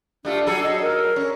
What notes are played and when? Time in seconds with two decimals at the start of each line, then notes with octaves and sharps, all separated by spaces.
0.25 G3 A3 D4 F4
0.46 F#3 G#4 A4
0.62 D#5
0.81 A#4
1.16 C#4